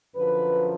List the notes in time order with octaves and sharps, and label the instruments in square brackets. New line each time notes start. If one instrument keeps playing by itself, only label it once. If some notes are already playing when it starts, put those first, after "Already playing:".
[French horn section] F#2 D3 F3 B4